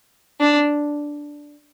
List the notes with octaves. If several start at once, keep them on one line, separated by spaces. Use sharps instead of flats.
D4